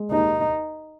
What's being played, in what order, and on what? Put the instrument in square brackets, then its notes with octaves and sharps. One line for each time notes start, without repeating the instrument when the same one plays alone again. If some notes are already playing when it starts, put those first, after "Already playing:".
Already playing: [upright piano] G#3
[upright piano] D#2 [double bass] D#4